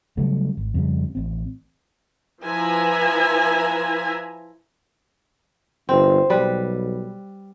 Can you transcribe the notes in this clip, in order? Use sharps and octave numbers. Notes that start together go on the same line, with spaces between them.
C#3 F#3 G3 A3
G#1
F2 C#3 G3
A1 C4
F3 E4 B4 E5 G#5 A#5
G1 C4
B1 G3 B4